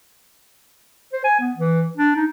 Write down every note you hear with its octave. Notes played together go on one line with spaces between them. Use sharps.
C5
G#5
B3
E3
D4
D#4